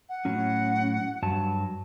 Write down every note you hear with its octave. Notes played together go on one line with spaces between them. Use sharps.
F#5
A2 F#3 C#4
G2 F#3 A5